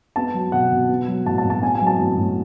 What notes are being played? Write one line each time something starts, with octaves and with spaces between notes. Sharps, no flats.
B3 A5
F#3
B2 F#5
B2
B3
F#3
A2 A5
A5
A2
A5
B3 G#5
G#5
F#3
A5
A2
A2